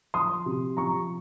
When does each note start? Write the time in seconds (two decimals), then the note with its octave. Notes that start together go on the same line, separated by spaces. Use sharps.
0.14 F3 C6 D#6
0.46 C3
0.77 F3 A#5 C#6